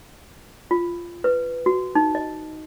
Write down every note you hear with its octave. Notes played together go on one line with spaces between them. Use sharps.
F4
B4
F#4
D#4
D#5